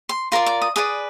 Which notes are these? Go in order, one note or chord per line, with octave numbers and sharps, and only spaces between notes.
C6
F4 A#4 D5 C6
D6
D#6
G#4 B4 D5 D#6